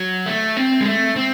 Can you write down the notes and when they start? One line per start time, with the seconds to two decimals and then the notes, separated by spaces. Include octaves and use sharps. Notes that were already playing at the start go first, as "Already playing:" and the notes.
Already playing: F#3
0.26 A3
0.57 C4
0.81 G#3
0.86 A3
1.16 C4